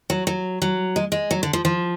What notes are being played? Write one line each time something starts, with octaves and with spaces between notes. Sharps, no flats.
F#3
F#3
F#3
G#3
G#3
F#3
D3
F3
F3